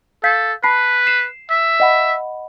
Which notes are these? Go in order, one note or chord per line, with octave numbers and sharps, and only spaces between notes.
A4 F5 G6 B6
B4 A5 B5 C7
C7 E7
E5
D#5 F#5 B5